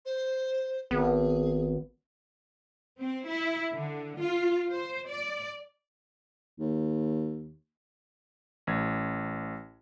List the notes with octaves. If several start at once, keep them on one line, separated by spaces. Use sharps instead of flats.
C5
G#1 B3 G#4
C4
E4
D3
F4
C5
D5
D#2
A1 G#6